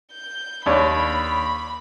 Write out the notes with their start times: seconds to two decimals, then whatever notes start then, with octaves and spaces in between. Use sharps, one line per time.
0.12 G6
0.66 D#2 D4 C#5 B5